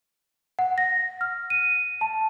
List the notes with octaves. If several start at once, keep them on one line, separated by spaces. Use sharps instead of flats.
F#5
A#6
F6
D#7
A5